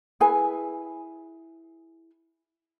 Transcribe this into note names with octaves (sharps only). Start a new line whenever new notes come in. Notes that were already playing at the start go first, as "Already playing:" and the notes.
E4 G#4 B4 G#5